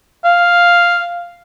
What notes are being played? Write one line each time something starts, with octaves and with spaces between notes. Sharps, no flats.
F5